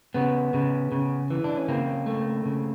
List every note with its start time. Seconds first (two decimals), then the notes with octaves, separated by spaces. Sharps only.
0.14 C#3 B3
0.54 C#3
0.92 C#3
1.30 E3
1.44 D4
1.57 C#4
1.68 C#3 A#3 C4
2.06 A3
2.45 C#3